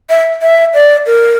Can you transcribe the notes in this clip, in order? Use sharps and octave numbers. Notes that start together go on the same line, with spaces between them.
E5
E5
D5
A#4